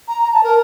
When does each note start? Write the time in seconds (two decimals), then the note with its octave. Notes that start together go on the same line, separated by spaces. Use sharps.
0.08 A#5
0.23 A#5
0.33 A5
0.44 A#4